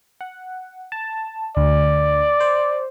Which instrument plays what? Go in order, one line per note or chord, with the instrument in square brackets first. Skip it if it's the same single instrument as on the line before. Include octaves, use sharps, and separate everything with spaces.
[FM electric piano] F#5
A5
[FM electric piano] D2 [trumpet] D5
[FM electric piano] C5